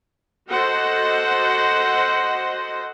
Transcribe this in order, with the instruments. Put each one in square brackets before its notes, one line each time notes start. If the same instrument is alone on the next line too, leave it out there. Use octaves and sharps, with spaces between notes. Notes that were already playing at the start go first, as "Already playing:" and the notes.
[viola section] F#4 A4 C5 D#5 F#5